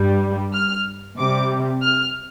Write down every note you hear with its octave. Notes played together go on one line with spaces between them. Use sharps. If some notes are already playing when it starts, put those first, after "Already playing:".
Already playing: G2 G3
F6
C3 G3 D6
F6